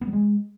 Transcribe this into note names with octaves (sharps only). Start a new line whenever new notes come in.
B3
G3
G#3